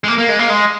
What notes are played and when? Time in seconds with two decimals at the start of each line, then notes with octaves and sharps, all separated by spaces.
0.04 G#3
0.08 A#3
0.18 A#3
0.29 G#3
0.39 A#3
0.50 G#3